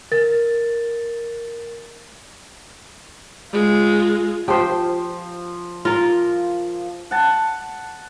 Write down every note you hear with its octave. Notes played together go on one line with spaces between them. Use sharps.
A#4 A6
G#3 F4
F3 G4 C5
F4 A#4
F#5 A5